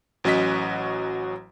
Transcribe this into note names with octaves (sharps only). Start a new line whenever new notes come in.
A1 F#3 C#4 F#4 D#5 B6